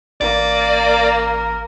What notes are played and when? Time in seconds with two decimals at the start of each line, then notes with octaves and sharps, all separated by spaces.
0.21 A1 A#3 D5
0.80 A#4